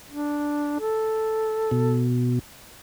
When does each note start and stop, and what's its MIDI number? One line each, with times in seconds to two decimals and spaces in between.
0.10 0.78 62
0.80 2.03 69
1.71 2.39 47